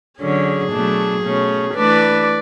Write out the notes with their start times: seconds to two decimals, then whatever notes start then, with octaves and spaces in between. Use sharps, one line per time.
0.19 D3 F#3 C#4 G#4
0.71 B2 F#3 A3 D4
1.23 B2 A3 C#4
1.74 E3 A3 D4 B4 D5